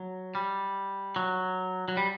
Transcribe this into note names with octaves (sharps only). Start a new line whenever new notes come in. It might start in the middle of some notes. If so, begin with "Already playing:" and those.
Already playing: F#3
G3
F#3
F#3
G3